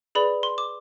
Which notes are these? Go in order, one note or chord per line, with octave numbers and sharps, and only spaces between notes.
G#4 B4 D5 B5
C6
D6